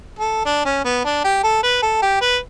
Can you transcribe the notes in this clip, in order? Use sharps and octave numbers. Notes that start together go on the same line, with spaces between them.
A4
D4
C#4
B3
D4
G4
A4
B4
A4
G4
B4